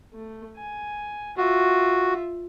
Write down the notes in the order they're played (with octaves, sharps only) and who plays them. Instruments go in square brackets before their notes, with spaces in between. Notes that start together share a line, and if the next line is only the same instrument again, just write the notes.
[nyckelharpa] A3
G#5
[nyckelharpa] F4 E5 [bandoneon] F#4